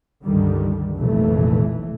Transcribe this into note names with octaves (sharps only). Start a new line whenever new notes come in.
C#2 G2 D3 D#3 G3
F1 B1 A#2 E3 A3